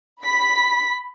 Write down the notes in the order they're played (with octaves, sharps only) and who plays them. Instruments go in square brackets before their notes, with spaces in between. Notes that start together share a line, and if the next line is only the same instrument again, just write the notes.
[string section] B5 B6